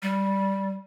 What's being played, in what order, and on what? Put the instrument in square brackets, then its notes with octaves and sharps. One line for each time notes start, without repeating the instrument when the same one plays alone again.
[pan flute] G3